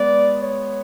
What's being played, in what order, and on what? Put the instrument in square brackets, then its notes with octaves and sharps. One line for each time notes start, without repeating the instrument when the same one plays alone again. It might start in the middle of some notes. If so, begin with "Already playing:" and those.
Already playing: [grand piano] G#3 B3 [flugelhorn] D5
[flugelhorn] C#5